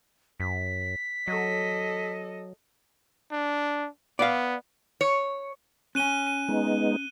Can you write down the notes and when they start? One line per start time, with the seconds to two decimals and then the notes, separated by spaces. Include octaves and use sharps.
0.40 F#2 B6
1.28 F#3 A4 D#5
3.32 D4
4.19 B3 D5 F5
5.01 C#5
5.95 C#4 G#5 F#6 D#7 G7
6.27 D#7
6.49 G#3 B3 D#4